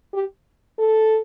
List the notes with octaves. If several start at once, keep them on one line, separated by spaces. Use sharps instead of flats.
G4
A4